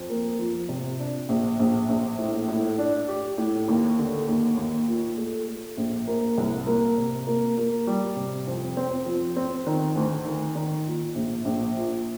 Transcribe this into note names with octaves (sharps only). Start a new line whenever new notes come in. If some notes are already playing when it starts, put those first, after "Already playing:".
Already playing: F2
A#3
F3
C3
D4
A#1
A#1
A#1
A2
A2
D4
G4
A2
D#2
D3
D#2
D#2
A#2
A3
A3
A#1
A#3
C2
A#3
C3
A#3
A#3
G3
C3
F2
C4
F3
C4
D#3
D2
D#3
D#3
A#2
A#1
A#1
A#2